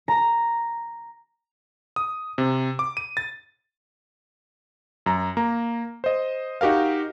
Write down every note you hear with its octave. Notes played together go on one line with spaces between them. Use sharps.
A#5
D#6
C3
D6
D#7
A6
F#2 A#5
A#3 A#5
C5 D#5
D#4 F#4 G4 A#4 F5